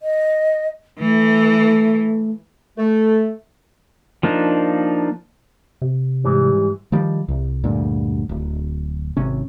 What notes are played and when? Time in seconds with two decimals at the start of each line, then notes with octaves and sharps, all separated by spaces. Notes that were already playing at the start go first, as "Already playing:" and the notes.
0.01 D#5
1.00 E3 A3
2.78 A3 A4
4.23 F3 A#3 D4 D#4
5.82 C3
6.24 G#2 E3 G3
6.92 D#3 F3 G3
7.28 C2
7.64 D2 G2 A#2
8.29 D1
9.17 G#1 C3 C#4